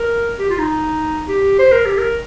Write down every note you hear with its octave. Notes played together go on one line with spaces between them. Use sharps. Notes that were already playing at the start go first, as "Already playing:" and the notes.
Already playing: A#4
G4
F4
D#4
G4
C5
A#4
G4
A#4